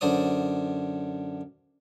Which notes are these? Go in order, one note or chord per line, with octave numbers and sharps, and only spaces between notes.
F#2 D3 C5 D5 D#6